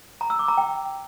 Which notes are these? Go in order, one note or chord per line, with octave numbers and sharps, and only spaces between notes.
A#5
E6
D6
A#5
G5